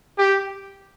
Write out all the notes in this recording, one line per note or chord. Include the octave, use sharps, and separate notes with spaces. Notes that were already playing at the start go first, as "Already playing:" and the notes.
G4